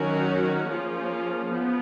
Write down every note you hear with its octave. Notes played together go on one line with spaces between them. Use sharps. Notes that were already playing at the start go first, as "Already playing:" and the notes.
Already playing: D#3 F#3 C#4 F#4 A#4
F3 A#3 C#4 F4 G#4
F3 B3